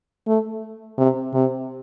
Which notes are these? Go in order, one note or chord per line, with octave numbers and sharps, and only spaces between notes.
A3
C3
C3